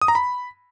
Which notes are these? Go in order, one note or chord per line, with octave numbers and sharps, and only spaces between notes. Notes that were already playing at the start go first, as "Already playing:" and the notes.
D#6
A#5
B5